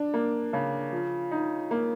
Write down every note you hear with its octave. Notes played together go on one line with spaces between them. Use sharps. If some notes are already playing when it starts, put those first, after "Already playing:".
Already playing: D4
A#3
C#3
F3
D#4
A#3